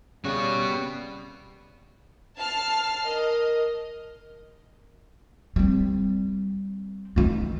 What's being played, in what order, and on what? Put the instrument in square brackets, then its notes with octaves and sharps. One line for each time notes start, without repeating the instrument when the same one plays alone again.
[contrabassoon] C#3 [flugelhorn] G3 [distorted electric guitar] B3 F#4
[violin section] A5 F6 C7
[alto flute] A#4 [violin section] D#5
[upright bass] G3 C4
E3 D#4